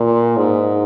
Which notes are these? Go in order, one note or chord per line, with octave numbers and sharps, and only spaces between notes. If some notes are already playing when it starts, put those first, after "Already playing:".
Already playing: A#2
G#2